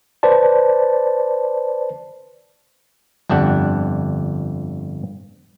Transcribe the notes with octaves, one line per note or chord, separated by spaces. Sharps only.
B4 C5 D5 A5
G1 F2 D4 G4 F#5